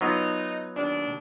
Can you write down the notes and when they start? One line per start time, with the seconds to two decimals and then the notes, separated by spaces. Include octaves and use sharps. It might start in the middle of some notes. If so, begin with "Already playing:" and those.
0.01 F#3 B3 D#4 F4
0.76 D#2 D4